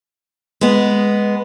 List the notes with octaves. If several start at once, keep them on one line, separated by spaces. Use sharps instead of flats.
G#3 B3